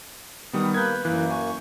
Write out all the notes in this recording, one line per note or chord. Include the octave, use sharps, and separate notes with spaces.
D#3 G3 B3 D#6
A#3 A#4 B4 G6 G#6
F#2 E3 A#3
G#5 C#6